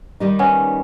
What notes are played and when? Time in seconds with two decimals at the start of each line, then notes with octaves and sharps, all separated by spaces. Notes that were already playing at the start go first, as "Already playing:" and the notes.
0.20 D#3 G3 D#4
0.39 B3 C#4